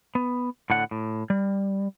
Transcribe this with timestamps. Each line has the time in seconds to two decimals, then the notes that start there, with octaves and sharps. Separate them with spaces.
0.15 B3
0.70 A2 D3 F#5
0.91 A2
1.30 G3